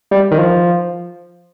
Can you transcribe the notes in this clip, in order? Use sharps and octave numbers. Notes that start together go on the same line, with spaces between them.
G3
D#3
F3